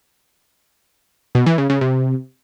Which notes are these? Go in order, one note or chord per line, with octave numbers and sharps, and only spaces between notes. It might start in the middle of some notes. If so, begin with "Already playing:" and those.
B2
E3
C#3
C#3
C3